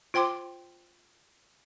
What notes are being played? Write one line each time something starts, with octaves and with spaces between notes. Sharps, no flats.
F4 C5 G5 C6 D6